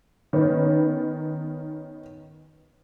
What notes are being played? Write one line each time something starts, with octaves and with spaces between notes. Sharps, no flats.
D#3 B3 C#4 D#4